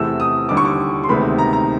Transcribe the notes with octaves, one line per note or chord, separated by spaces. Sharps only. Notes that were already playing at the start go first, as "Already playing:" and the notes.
Already playing: E2 C3 E3 A3 E6
D#6
D#2 D3 G3 D6
C#6
D6
C6
D2 C3 D#3 G#3 B3 B5
A#5
A#5